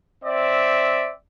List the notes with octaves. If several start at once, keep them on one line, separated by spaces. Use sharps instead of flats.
C4 D5 E5